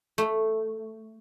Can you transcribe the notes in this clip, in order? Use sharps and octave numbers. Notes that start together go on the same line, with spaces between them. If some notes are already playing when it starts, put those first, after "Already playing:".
A3